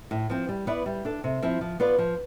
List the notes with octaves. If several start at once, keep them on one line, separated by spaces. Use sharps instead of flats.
A2
F3 C4
G3
B3 E4 B4 D5
G3
D4 A4
C3
F3 C4 E4
F3
B3 F4 B4 D5
F3